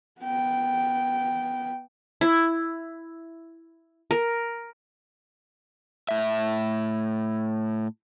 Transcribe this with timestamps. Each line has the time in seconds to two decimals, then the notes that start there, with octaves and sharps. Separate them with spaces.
0.21 B3 G5
2.21 E4
4.11 A#4
6.09 A2 E5